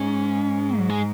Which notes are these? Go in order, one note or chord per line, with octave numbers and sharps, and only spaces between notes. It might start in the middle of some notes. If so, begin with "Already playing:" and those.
Already playing: G#2 C#4
F#3
G#3